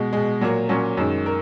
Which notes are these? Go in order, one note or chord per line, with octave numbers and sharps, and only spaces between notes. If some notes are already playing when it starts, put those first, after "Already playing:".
Already playing: B2 G#3
B2 G#3
A#2 F#3 A#3
A#2 F#3 A#3 C#4
F#2 D#3 G#3
A#4